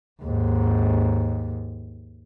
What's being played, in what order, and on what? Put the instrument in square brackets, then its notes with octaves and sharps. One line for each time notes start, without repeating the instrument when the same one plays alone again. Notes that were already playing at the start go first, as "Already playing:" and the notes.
[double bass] D#2 G#2